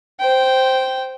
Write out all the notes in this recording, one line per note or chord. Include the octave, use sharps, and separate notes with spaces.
C5 G5